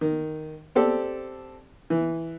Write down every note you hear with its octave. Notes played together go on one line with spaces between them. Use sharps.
D#3
C4 G4 A4 D5
E3